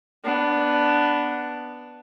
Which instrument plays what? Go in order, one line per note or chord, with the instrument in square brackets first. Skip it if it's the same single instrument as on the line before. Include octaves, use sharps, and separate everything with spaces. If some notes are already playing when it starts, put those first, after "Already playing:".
[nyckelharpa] B3 D4